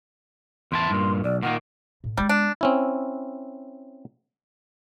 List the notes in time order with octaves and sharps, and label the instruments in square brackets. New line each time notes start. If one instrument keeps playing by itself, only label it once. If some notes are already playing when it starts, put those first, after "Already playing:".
[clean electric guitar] E2 E4 A5 [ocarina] C6
[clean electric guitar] G2 A#2
[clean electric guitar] B1 [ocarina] D5
[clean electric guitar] A#2 D#3 A#3 [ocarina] F#5
[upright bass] A2
[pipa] G3 [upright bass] G#3 B3
[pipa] D4
[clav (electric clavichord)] C4 C#4 E4